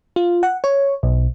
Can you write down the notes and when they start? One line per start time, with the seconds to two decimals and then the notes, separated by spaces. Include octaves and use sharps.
0.16 F4
0.43 F#5
0.64 C#5
1.03 B1